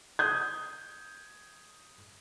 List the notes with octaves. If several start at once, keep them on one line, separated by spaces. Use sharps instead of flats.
D#6 G6 G#6